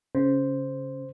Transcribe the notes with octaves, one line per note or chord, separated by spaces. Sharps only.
C#3 C5